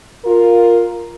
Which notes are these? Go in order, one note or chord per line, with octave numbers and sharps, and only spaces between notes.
F4 A#4